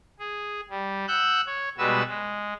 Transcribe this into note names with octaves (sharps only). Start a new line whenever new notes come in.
G#4
G3
F#5 E6 F#6 G6
C#5
B2 G3 G#3 F#4 B4 E6
G#3